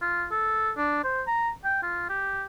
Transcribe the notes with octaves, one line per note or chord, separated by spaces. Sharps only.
F4
A4
D4
C5
A#5
G5
F4
G4